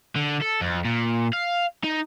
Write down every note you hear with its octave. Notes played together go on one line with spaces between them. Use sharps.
D3
A4
F2
A#2
F5
D#4